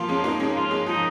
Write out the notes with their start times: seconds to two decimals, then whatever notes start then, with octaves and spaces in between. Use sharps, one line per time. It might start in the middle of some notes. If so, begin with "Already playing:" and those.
Already playing: F3 A#3 F4
0.08 G#3 C#4
0.24 A#3 D#4
0.40 G#3 C#4
0.55 F4
0.71 G#3
0.86 F3 D#4